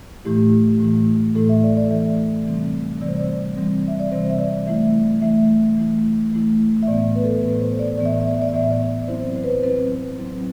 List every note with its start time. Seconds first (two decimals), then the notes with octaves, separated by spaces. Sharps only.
0.25 A2 E3 A3 E4 G4
0.80 A2 E3 A3 E4
1.35 A2 E3 A3 E4 A4
1.49 E5
1.63 D5
1.77 D5
1.90 A2 E3 A3 E4 E5
2.46 C3 E3 G3 C4
3.01 C3 E3 G3 C4 D5
3.08 C5
3.16 D5
3.56 C3 E3 G3 C4
3.88 E5
4.00 D5
4.12 C3 E3 G3 C4 C5
4.30 E5
4.39 D5
4.66 E3 A3 E4 E5
5.22 E3 A3 E4 E5
5.77 E3 A3 E4
6.33 E3 A3 E4
6.83 E5
6.87 A2 E3 B3 D5
7.15 B4
7.24 A4
7.43 A2 E3 B3 B4
7.61 C5
7.79 D5
7.98 A2 E3 B3 D5
8.05 E5
8.13 D5
8.20 E5
8.27 D5
8.34 E5
8.42 D5
8.49 E5
8.53 A2 E3 B3 D5
8.63 E5
8.71 D5
9.08 F#3 C4 E4 C5
9.36 C5
9.44 B4
9.51 C5
9.63 F#3 C4 E4 B4
10.19 F#3 C4 E4